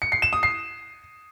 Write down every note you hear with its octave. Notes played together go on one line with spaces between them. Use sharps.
C#7
C7
E7
D#6
C7